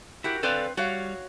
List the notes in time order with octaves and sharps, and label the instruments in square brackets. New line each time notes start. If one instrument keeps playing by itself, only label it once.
[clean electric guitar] E4 [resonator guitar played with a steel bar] F#4 G4 A#4
[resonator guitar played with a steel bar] C4 B4 [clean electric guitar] A4 D5 F5
[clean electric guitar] G3 [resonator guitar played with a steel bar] F#4 C#5 F5